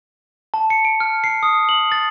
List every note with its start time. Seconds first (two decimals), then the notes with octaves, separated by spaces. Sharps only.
0.54 A5
0.70 C#7
0.85 D7
1.00 F6
1.24 C7
1.43 D#6
1.69 F#7
1.92 A6